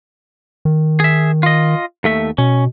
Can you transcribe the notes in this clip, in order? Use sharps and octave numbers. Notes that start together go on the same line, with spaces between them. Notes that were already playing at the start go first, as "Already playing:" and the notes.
D#3
G#4 E5
F4 D#5
D#2 A3 E5
B2 C#4